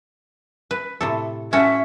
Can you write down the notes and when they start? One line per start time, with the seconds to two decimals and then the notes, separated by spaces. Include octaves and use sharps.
0.71 B4
1.01 A2 C3 A4
1.53 C#4 F#4 A4 E5